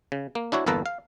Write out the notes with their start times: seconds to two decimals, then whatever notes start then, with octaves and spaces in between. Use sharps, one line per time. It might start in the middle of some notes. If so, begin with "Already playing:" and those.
0.12 C#3
0.35 A#3
0.52 D4 E4 F#4 C#5
0.66 G1 E2 A#3 A4 B4 A#5
0.86 F5